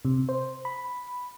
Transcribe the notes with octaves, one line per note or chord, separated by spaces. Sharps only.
C3
C5
B5